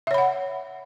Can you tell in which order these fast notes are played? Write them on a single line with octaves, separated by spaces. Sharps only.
E5 C#5 B5 F#5